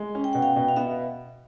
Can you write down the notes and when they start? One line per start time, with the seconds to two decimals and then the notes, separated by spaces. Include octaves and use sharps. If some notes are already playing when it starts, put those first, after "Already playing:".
Already playing: G#3
0.15 C#4
0.24 G5
0.33 B2 F#5
0.42 F5 G5
0.56 B2
0.68 F5
0.76 B3 E5 F#5